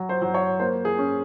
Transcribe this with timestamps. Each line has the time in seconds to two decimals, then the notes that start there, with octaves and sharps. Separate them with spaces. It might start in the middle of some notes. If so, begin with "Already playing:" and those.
Already playing: F#3
0.09 C5
0.22 F#3
0.34 C#5
0.60 A#3 C5
0.85 G#4
0.98 C#4